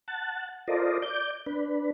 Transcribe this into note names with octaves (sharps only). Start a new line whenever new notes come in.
F#5 A5
F4 A4 A#4 C5 D5 D#5
D5 G6
D4 B4